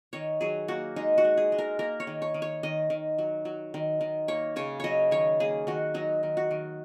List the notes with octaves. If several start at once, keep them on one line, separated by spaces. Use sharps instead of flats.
D#3 C#5
F#3 G#4
A#3 F#4
G#3 D#4
F#4
G#3
G#4
G#3
A#4
A#3 A#4
C#5
D#3
C#5
D#3
C#5
D#3 D#5
D#3
F#3
F#3
D#3
D#3
A#3 C#5
C#3 C#5
F#3 C#5 D#5
D#3 C#5
A#3 G#4
D#3 F#4
F#3 D#4
D#3
F#4
D#3